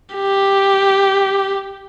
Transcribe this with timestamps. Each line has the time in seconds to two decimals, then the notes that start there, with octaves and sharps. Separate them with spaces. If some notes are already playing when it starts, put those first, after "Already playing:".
0.15 G4